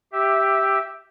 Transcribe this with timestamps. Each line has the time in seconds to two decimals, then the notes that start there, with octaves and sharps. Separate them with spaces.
0.12 G4 E5